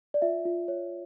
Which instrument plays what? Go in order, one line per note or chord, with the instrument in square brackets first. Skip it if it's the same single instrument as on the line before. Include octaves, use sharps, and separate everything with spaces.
[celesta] D5
F4 E5
F4
C#5